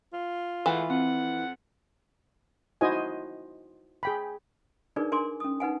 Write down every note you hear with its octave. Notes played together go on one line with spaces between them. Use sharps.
F4
E3 G#3 A3 F#5
F2 C4 F#5
D#4 E4 F#4 C5 D#5 G#5
G#4 G5 B5
D4 D#4 G#4 A#4 B4 D5
D4 A#4 G#5 C6 D6
C#4 D#6
D#4 B4 F#5 G#5